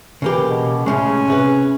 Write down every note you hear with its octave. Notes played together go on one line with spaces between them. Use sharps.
C#3 E3 A#3 G4
B2
A2 C#3 G#3 C#4
C3 G#4 B4